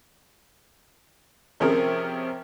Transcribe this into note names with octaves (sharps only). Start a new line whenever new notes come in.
C3 F3 C#4 G#4 A#4